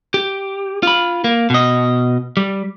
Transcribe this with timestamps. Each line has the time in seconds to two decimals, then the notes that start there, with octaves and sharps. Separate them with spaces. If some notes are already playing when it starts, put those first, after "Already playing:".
0.14 G4
0.83 F4 B5
1.24 A#3
1.50 B2 D#5
2.37 G3